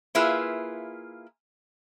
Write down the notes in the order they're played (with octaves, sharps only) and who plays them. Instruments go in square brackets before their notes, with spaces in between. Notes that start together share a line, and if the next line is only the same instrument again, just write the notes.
[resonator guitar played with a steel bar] A#3 E4 F4 G#4 B4 E5